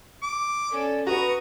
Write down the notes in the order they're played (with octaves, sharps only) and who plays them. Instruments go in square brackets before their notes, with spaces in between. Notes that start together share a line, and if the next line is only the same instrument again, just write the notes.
[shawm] D6
[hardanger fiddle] C#4 A4 [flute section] D5
[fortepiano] F#4 [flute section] B4 [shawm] A#5 [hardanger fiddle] C#6 D#6